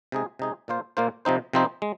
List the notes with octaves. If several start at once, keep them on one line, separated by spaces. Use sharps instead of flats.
C3 G#3 D#4 G#4
C3 G#3 D#4 G#4
A#2 A#3 F4 C5
A#2 A#3 F4 C5
C3 F3 C4 D#4 C5
C3 F3 C4 D#4 C5
G#3